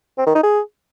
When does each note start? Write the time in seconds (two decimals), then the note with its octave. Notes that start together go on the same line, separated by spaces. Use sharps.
0.18 C4
0.26 D#3
0.35 D#4
0.44 G#4